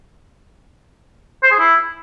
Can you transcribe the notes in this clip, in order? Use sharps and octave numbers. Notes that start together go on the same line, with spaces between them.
C5
G#4
E4